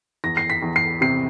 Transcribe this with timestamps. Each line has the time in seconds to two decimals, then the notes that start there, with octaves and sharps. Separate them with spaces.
0.24 E2 A#6
0.37 C7
0.50 B6
0.62 E2
0.76 C7
1.01 C3 C7